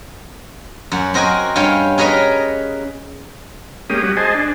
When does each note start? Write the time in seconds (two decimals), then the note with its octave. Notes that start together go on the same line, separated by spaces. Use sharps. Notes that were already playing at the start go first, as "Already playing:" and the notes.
0.92 F#2 F#5
1.14 C4 F#4 A#4 D#5 G5 G#5
1.56 G2 C#4 C#5 F5 G5
1.98 C#4 G#4 A#4 B4 C#5 D#5
3.90 G#3 A#3 C#4 G4 D#6
4.03 G3 F#4
4.17 G#4 C5 D#5 G#5 A5
4.35 D4